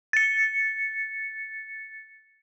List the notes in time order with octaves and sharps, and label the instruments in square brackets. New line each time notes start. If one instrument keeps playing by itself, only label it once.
[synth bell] A6 C#7